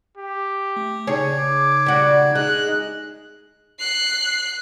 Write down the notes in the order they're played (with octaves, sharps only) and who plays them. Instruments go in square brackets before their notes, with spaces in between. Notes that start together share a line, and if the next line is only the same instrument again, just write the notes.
[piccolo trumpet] G4
[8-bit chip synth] A3
[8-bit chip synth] C#3 D#4 G#6 [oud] G#4 C#5
[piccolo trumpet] D6
[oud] G3 F#4
[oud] G#3 [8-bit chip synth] D#4 G#4 D#5 [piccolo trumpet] F#6
[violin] F#6 C7